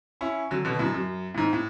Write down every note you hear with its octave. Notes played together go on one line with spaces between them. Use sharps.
C#4 E4
D3 F#3
B2 D3
F#2 A2
F#2
A2
G#2
A2